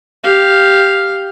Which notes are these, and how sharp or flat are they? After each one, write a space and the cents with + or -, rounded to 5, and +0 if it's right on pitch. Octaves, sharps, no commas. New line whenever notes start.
G4 +0 F5 +0